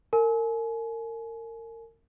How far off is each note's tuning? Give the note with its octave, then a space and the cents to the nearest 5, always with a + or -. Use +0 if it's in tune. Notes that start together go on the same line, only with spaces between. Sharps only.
A#4 -35 G#5 +35